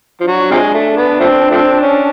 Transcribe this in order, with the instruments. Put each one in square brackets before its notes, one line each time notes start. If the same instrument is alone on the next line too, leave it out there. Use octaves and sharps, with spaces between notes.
[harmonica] F3
[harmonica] F#3 [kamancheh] D4
[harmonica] C3 F3 G#3
A3
B3
F3 A3 C4
F3 A3 C4
C#4